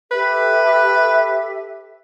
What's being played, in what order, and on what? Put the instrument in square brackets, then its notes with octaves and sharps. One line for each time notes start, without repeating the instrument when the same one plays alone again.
[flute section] G4 A4 E5 [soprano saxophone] B4